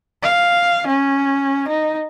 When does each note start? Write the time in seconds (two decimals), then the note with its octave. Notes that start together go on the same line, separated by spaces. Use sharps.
0.23 F5
0.87 C#4
1.68 D#4